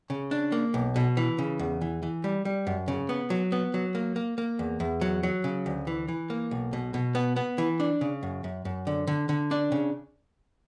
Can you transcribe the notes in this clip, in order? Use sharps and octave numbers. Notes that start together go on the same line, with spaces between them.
C#3
D4
A#3
B1
B2
E3
C#3
E2
E3
E3
G3
G3
F#2
C#3
B3
F#3
B3
F#3
A#3
A#3
A#3
E2
E2
F#3
F#3
C#3
D2
E3
E3
A#3
B1
B2
B2
B3
B3
E3
D4
C#3
F#2
F#2
F#2
D3
D3
D3
D4
C#3